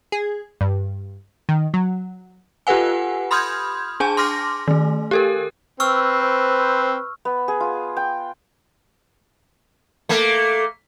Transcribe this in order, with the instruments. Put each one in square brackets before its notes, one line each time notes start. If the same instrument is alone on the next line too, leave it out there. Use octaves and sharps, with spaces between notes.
[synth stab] G#4
G2
D#3
F#3
[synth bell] F4 G4 A4 B4 F#5 G#5
B5 C6 D#6 F6 G6 G#6
D4 G#4 G#5 A5
C6 D6 F6 A#6
D#3 A3
G4 A4 A#4
[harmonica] C4 [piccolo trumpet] B4 [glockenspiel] C#6 E6 F6
[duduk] C5
[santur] B3
G#4
F4
G5
[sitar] A3 A#3